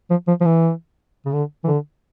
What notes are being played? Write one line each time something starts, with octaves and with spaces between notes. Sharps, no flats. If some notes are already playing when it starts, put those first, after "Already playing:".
F3
F3
F3
E3
C#3
D3
E3
D3